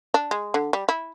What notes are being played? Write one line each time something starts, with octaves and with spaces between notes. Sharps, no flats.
D4
G#3
D3
G3
E4